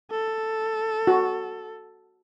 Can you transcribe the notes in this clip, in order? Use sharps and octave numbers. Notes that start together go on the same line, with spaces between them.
A4
F#4